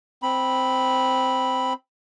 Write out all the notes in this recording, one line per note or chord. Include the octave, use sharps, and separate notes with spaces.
C4 B5